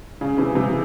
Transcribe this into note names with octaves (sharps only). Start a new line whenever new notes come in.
C#3
C3 E3
C3 E3